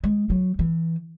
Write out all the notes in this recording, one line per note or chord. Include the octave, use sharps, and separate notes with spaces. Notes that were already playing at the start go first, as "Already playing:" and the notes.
G#3
F#3
E3